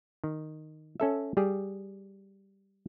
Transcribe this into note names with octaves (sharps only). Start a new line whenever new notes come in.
D#3
C#4 A4 E5
G3 G4 G#4